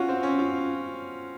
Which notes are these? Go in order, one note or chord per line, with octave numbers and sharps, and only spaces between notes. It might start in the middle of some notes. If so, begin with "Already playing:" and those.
Already playing: C#4 F4 F#4
C4
C#4
F4